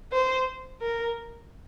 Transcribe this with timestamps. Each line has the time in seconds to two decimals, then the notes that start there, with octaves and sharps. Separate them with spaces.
0.12 C5
0.82 A#4